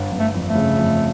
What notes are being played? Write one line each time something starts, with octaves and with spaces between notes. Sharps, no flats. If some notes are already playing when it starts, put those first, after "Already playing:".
Already playing: G1
G1
A3
F2
A3
C#3
F2